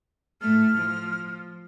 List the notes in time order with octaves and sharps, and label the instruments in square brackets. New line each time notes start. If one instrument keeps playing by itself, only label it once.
[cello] A2 A3 [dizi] F6
[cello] F3